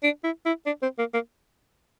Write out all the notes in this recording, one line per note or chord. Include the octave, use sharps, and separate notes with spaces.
D4
E4
E4
D4
C4
A#3
A#3